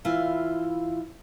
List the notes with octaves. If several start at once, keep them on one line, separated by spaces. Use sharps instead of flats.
E3 E4 F4 F5